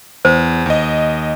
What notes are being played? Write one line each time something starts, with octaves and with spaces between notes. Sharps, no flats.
E2 C5
D#2 D#5